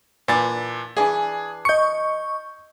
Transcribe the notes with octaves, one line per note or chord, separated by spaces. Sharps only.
A#2 E3 D4 B4 A6
E3 D4 G#4 G#5
D#5 C#6 G6 C#7